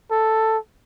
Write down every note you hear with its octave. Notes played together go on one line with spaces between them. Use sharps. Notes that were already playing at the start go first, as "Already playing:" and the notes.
A4